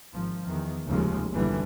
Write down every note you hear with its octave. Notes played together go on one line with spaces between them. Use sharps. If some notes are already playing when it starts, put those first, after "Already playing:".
G#1 F3
E2 D#3
F1 D#2 C#3 F3 G#3
F#1 B1 D3 E3 G3